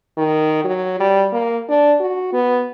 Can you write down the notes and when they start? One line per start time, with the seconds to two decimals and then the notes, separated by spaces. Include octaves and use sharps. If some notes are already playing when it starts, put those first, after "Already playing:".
0.17 D#3
0.64 F#3
1.00 G3
1.33 A#3
1.69 D4
2.00 F#4
2.33 B3